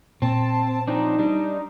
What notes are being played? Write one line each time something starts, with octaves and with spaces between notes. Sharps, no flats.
A#2 C4 A5
F3 C4 D4 D#4
G3 D4